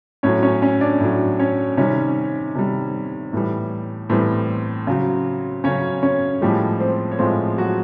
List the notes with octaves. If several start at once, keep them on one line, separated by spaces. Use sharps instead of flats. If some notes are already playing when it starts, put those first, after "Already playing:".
A2 F#3 C#4 C#5
C#4 C#5
C#4 C#5
D4 D5
A2 F#3
C#4 C#5
C3 D#3 G3 C#4 C#5
C3 D#3 G3
A2 E3 G3
A2 E3 G3 C4 C5
C#3 F#3
C#3 F#3 C#4 C#5
C#4 C#5
A2 F3 G3 G#3 G4
C4 C5
C#5
A2 F3 G#3 C4 C5
F#3 F#4